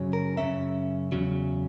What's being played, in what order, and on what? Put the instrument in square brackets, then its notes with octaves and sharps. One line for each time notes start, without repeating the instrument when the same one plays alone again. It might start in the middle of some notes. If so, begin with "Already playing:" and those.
Already playing: [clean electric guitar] F#2 C#3 F#3 C#4
A#4
F#2 C#3 F#3 C#4 E5
E2 C#3 F#3